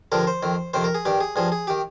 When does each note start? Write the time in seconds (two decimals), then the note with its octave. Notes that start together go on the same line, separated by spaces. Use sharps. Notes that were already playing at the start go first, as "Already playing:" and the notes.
0.12 G2 D3 F3 A#4
0.27 C5
0.43 F2 D#3
0.74 F2 C3 D#3 C5
0.84 A#4
0.95 G#4
1.05 G2 D#3 G4
1.21 G#4
1.36 G2 F3 G#4
1.52 G#4
1.67 D#3 G4